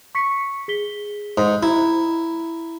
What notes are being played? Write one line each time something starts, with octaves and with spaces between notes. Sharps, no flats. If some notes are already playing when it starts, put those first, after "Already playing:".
C#6 B6 C#7
G#4 B6 G7
G#2
E4 A#5